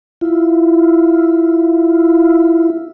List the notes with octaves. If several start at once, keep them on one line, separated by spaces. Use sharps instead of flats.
E4 F4